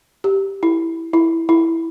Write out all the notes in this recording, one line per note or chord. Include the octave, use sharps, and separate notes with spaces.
G4
E4
E4
E4